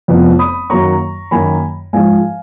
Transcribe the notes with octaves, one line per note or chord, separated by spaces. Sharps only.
F1 F2 F3 B3
B5 D#6
F#2 D#3 F#3 A#3 A#5 C#6
F#2 D#3 F#3 A#3 G#5 B5
G#2 F3 G#3 F5 G#5